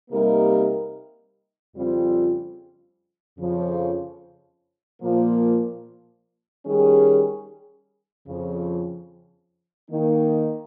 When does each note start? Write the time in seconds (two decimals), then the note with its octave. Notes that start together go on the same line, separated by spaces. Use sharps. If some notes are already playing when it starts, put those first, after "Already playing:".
0.11 C3 G3 A#3 D#4 A#4
1.75 F2 C#3 G3 C4 F4
3.37 F2 C#3 F3
5.01 A#2 F3 A#3
6.65 D#3 G3 C#4 G#4
8.27 F2 C#3 F3
9.91 D#3 A#3 D#4